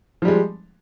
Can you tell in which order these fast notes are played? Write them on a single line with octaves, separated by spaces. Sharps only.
F3 G3 G#3